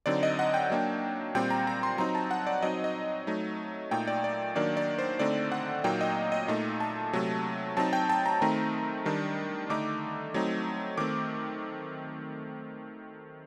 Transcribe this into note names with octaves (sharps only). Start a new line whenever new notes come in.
D3 F#3 C4 D#4 D5
D#5
F#5
G5
F#3 A#3 D4
A#2 G3 C4 G5
A#5
A#5
C6
F#3 C4 D#4 A#5
A5
F#5
D5
F#3 C4 D#4 D#5
D#5
F#3 A3 D#4
A#2 A3 D#4 G5
D5
D5
D#3 F#3 A#3 D4 D5
D5
C5
D3 A3 C4 D#4 D5
F#5
A#2 F#3 A#3 D#4 G5
D#5
D#5
A#2 A3 D#4
A5
C3 F#3 A3
F#3 C4 D#4 A5
G5
A5
A#5
D#3 A3 C4 D#4
D#3 G3 D4
D3 A3 D#4 D6
F#3 A3 C4 D#4
D#3 A3 C4 D6